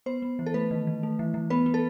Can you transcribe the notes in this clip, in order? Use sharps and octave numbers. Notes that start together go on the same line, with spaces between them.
B3 C5
B3
E3
A4
A3 B4
D#3
D#3
A3
E3
E3
B3 B4
B3
A4